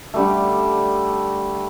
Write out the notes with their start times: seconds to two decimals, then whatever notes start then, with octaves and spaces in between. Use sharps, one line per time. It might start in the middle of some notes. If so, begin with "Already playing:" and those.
0.14 D3 G3 A3